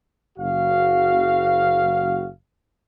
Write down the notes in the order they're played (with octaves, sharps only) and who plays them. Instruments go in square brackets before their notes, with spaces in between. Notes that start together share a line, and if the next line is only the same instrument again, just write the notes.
[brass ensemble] F#1 F#4 F5